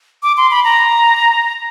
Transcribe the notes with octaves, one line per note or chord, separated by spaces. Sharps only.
D6
C6
B5
A#5